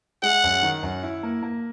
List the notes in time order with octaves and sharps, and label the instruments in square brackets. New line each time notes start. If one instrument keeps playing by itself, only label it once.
[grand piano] G#3 [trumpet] F#5
[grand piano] F#2
D#3
F#2
E4
A#3
A#3